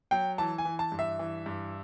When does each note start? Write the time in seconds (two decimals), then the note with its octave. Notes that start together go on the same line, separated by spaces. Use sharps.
0.11 F#3 G5
0.38 E3 A5
0.58 G#5
0.65 E3
0.79 A5
0.92 G2
0.99 E5
1.19 E3
1.46 G2